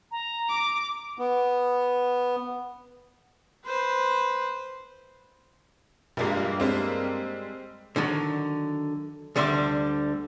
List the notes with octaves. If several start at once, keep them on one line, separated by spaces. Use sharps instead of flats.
A#5
D6
B3
B4 C5
A#1 G2 G3 G#3 A#3
G3 G#3 C4
D3 D#3 F#3
D2 D3 G3 E5 C6